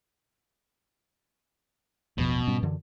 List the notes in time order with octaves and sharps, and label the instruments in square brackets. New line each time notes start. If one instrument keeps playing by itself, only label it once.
[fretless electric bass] A1 E2 F3 [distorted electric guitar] B2
[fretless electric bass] G#2 G3 C#4
F#2 D3 E3